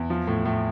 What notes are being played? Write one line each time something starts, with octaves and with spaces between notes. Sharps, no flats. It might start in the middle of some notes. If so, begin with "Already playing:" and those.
Already playing: E2
F3
A2
A2